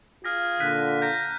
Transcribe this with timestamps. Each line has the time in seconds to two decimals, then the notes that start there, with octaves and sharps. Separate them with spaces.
0.25 F4 G#4 F6 A#6
0.60 A#2 D3 F#6 B6 D#7
1.02 A#5 G6